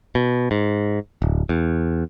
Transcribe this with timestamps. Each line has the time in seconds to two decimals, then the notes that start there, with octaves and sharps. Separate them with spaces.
0.15 B2
0.51 G#2
1.22 D1
1.49 E2